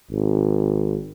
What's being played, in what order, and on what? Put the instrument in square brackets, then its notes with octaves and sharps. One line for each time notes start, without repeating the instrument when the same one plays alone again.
[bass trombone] G#1